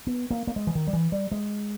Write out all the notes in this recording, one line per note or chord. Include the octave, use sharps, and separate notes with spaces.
B3
A#3
A#3
G#3
E3
D#3
G3
E3
G3
G#3